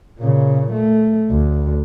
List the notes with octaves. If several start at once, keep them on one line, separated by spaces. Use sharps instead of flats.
A#2 C#3
A3
D2